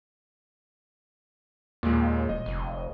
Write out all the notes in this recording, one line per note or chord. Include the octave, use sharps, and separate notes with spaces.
D#2 A#2 G#3
D#1 D#5
F1